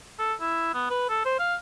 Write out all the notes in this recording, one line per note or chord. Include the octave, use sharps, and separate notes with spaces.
A4
E4
B3
B4
A4
C5
F5